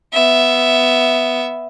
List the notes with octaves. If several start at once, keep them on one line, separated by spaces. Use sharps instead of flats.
B3 E5